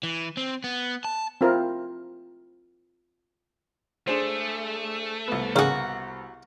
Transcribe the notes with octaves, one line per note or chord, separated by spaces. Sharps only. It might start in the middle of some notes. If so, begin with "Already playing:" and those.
E3
C4
B3
A5
C4 E4 F4 A#4
A3 D4 G#4 C5
C2 B3
C#3 A#3 F#4 G#4